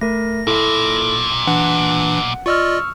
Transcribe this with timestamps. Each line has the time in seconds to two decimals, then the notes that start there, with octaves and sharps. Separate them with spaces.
0.01 A3 A#4 A#6
0.47 B1 A#2 E4 A4
1.47 E3 D4 F#5
2.46 F4 D5 D#5 C#6 E6 F6